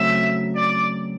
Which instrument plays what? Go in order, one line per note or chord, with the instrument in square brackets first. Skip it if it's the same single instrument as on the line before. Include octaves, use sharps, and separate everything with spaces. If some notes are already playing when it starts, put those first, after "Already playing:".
Already playing: [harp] C#3 F#3 A3 C4 [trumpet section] E5
[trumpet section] D5